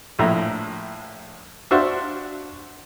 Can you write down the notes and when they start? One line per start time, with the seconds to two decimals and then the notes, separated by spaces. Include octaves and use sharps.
0.19 A#1 A2 E5 A#5
1.71 D4 F#4 C5 E5 F5 C#6